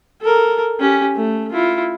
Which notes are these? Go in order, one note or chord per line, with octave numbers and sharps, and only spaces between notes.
A4 A#4
C#4 G4
A3
E4 F4